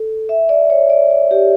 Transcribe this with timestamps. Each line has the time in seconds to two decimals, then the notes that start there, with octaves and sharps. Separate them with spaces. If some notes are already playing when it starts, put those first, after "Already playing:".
Already playing: A4
0.29 E5
0.49 D5
0.70 C#5
0.90 D5
1.11 D5
1.31 G4